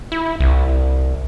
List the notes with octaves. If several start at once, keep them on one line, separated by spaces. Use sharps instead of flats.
E4
C2